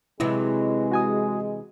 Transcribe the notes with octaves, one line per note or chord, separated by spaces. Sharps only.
C3 E3 F#3 G#3 E4
F#4 G#5 D#6